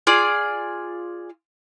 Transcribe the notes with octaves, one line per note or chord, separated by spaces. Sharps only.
F4 G#4 D5